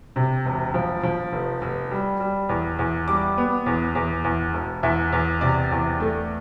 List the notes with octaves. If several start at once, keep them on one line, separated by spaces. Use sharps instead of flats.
C3
E1
F3
F3
F1
F1
G3
G3
E2
E2
G3 D6
B3
E2
E2
E2
E1
E2 E5
E2
C3 D5
E2
A3